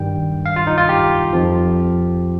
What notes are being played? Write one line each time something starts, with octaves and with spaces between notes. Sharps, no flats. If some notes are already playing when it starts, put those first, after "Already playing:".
Already playing: G2 D#3 G3 G5
F5
F4
D#4
F4
G4
F2 F3